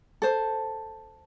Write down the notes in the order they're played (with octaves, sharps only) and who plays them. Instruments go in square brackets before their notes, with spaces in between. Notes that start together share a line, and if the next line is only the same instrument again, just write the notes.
[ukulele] A4 C5